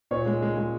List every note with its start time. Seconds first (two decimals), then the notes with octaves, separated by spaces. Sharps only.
0.11 A#2 C#5
0.26 G#3
0.42 G#3
0.57 G#3